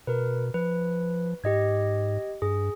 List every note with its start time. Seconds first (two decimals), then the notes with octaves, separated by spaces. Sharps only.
0.07 B2 A#4 B4
0.54 F3 B4
1.44 G#2 G4 D#5 G#6
2.42 G2 G#4